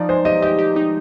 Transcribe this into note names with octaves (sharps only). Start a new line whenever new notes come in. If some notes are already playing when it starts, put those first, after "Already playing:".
Already playing: F3 D#4 D5
G#3 C5
G4 D#5
G4 D#5
G4
D#4